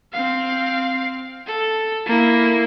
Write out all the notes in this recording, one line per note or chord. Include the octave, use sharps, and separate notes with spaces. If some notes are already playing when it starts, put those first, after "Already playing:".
C4 F5
A4
A#3 E4